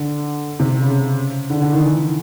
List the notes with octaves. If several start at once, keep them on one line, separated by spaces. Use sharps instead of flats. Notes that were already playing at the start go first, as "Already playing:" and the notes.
Already playing: D3
C3
C#3
C#3
D3
D3
D#3
E3